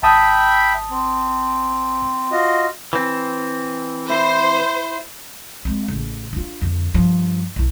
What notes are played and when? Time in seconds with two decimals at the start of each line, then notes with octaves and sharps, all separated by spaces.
0.03 G#1 E5 G5 A5 B5 D#6
0.90 C4
2.31 F4 F#4 D#5
2.93 E3 C4
4.09 E4 C5
5.65 G#3 C4
5.88 A1 C#3
6.33 D4 F4
6.61 F2 D3
6.94 G2 F3
7.56 B1 E4